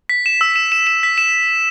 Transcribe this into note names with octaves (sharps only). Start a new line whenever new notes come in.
B6
E7
E6
E7
E7
E7
B6
E7